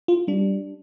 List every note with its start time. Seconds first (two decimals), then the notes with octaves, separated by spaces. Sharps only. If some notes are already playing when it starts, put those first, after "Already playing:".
0.08 F4
0.28 G3 D4